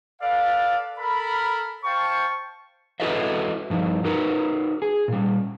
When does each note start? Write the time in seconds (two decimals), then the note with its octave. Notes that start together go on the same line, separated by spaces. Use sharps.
0.20 A4 B4 D5 F5
0.98 A4 A#4 B5
1.84 C5 F5 G5 A5 C#6
3.00 E4 F#4 A4 B4 D#5 E5
3.70 G2 F3 D#4 E4
4.04 D#4 F#4 A#4 B4
4.82 G#4
5.08 A#2 G3